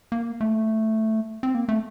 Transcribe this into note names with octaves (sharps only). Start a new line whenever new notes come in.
A#3
A3
C4
A#3
A3